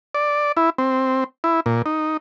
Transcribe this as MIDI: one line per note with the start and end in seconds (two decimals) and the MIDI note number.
0.15 0.52 74
0.57 0.70 64
0.78 1.24 60
1.44 1.60 64
1.66 1.82 46
1.86 2.17 63